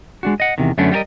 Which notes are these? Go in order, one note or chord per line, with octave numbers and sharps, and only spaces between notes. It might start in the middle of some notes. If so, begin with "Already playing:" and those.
G#3 D4 F#4
D#5 F#5
E2 C3 D#3
F#2 D3 A3 B3 C#4 D4
G3 F4 G4 A#4 D#5